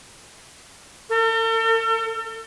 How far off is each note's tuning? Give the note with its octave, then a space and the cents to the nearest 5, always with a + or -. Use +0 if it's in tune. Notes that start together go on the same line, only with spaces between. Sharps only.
A4 +45